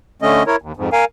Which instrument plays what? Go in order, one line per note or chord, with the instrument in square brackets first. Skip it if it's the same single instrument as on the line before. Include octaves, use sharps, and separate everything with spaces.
[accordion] D3 A3 C#4 D#5
E4 A#4 C#5
D#2
F2 G#2
A#4 F5 G#5